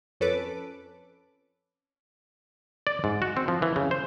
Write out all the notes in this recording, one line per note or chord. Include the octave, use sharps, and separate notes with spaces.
F2 C#4 A4 B4 D6
D5
G#2
F#4
C4
F3
E3
C#3
C5